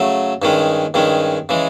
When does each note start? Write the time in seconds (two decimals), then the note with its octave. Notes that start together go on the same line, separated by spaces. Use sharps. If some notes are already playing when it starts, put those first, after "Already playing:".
Already playing: C#3 F#3 A3
0.42 G2 D#3 G#3 C#4
0.94 G2 D#3 G#3 C#4
1.49 C#3 E3 G#3